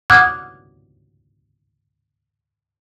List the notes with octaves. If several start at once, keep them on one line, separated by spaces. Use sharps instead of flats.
F#5 D6 D#6 F6 F#6 G#6